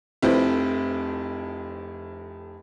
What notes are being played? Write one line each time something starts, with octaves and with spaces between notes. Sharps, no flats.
F1 F2 E4 B4 C5